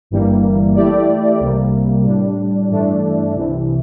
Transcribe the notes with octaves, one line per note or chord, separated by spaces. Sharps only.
G1 G2 E3 G3 A#3
E3 A3 E4 G4 D5
C2 C3 G3 A#3
A2 G3 D4
G2 E3 A3 D4
C2 C3 E3